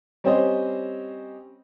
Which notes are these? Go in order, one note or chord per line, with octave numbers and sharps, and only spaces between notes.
G3 C4 C#4 G4 C5 D#5